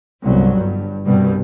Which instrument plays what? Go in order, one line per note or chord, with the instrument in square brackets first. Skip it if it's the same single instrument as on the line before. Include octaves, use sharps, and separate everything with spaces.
[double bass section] G1 C2 F#3
G2
C2 G2 B2 G3